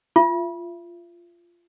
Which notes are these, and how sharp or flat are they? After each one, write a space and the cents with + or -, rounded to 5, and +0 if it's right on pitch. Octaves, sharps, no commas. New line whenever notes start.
F4 -15 E5 +30